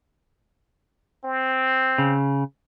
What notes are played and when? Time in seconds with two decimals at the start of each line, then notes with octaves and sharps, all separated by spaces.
1.24 C4
1.98 C#3